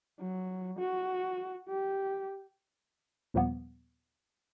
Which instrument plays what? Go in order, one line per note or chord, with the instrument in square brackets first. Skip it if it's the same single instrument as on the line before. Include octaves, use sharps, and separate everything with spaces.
[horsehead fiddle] F#3
F#4
G4
[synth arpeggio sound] D#2 A#2 F3 G3 A#3 B3